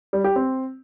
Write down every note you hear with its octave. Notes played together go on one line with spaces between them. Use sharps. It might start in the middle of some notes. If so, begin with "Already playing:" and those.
G3
G4
C4